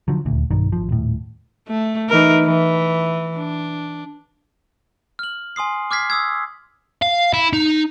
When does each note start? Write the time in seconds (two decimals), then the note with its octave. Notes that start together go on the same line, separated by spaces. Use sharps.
0.08 D3 F3 F#3
0.25 D#1 D2
0.51 B1 G2 D#3
0.72 G#1 F3
0.89 D#1 A2
1.67 A3
2.09 E3 D#4 A#4
2.44 E3
3.36 D4
5.19 F6 F#7
5.56 G#5 C6 D#6 C7
5.91 D6 F6 G#6 B6 C7
6.10 D#6 E6 G#6
7.02 F5
7.34 E4
7.53 D#4